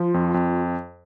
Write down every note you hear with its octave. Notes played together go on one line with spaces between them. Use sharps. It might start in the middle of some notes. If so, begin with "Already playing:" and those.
Already playing: F3 F4
F2
F2